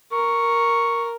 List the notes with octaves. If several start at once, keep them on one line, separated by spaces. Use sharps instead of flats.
A#4 C#6